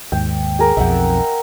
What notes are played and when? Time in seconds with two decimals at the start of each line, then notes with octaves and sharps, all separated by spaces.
0.12 D#2 G#2 G5
0.59 G#4 A#4 D6
0.77 B1 F2 E5 F#5 G5